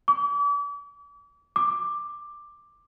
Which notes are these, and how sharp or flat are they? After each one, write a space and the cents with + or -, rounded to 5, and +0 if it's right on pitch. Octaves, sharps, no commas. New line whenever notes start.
D6 -40
D6 +10